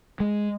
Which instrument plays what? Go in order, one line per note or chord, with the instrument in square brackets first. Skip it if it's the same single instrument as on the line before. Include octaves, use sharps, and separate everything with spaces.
[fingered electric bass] G#3